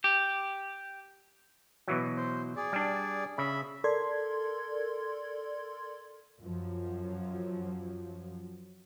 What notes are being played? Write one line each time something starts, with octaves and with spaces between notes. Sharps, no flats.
G4
B2 E3 F#3
C5
G#4 D5
G3 D4
C#3 E5 B5
A4 A#4 D5 C6 G#6
F#2 F3 F#3